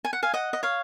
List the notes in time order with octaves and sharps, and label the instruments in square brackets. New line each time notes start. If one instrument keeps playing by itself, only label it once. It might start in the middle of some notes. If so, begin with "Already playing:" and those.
[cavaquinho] G#5
F#5
F5 G#5
D#5 F#5
D#5
C#5 F5